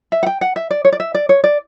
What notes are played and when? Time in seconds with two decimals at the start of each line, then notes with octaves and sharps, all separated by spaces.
0.12 E5
0.23 F#5
0.26 G5
0.41 F#5
0.56 E5
0.71 D5
0.85 C#5
0.92 D5
1.00 E5
1.14 D5
1.29 C#5
1.44 D5